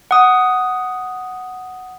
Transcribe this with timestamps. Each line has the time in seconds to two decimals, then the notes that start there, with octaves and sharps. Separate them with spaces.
0.11 F#5 D#6